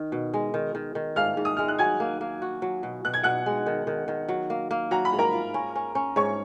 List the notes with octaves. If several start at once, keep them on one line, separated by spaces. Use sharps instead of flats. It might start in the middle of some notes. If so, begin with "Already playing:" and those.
Already playing: D#3
B2
G#3
D#3
D#3
D#3
G#2 F5 F6
G#2
D#6
G#3 F6
F#6
F#3 G#5 G#6
A#3
A#3
F#4
F#3
B2
B2 F#6
G#6
B2 F#5 F#6
G#3
D#3
D#3
D#3
F#3
A#3
A#3
F#3 A#5
B5
G#2
A#4 A#5
F4
C#4
C#4
C#4
G#2 C#5 C#6